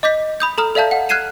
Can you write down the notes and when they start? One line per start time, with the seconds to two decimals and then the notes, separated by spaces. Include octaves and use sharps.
0.03 D#5 D6 G6 B6
0.40 B5 D#6 G6
0.58 A4 A#5 D#6 F6
0.75 A4 D5 E5 F5 A5 G6
0.91 F5 F#5
1.09 F6 F#6 G#6 C7 D#7 E7